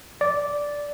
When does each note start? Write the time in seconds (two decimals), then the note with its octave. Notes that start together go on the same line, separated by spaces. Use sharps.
0.21 D5